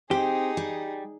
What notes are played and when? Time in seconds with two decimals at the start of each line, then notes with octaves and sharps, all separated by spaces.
0.11 C4 D#4 G4 G#4
0.57 G3